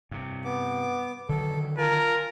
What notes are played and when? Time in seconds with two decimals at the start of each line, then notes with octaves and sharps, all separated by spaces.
0.11 G2 C3
0.45 B3 D6
1.29 D3 D#3 F#3 A4
1.78 F4 A#4 G#5 A5